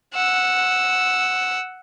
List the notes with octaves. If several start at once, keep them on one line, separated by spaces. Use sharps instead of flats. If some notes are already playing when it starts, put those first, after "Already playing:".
F#5 E6